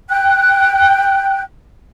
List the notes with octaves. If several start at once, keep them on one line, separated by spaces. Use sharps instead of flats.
G5 F#6